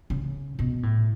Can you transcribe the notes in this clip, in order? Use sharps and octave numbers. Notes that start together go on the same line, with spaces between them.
C#3
B2
A2